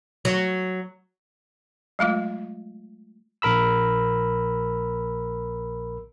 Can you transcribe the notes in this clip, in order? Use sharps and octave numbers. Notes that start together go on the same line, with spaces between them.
F#3
F#3 G#3 A3 F4
A#1 A#4 B5 E6